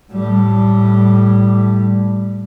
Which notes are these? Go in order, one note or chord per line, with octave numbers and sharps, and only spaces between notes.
A2 G3